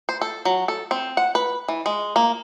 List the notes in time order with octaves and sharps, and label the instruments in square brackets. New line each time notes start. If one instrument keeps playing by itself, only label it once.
[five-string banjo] C5
A4
F#3
A4
C4
F#5
B4
E3
G#3
A#3